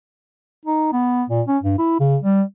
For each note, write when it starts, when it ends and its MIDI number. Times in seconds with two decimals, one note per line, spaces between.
0.65 0.89 63
0.93 1.23 59
1.30 1.42 46
1.48 1.58 61
1.63 1.77 43
1.79 1.95 64
2.00 2.17 49
2.22 2.42 55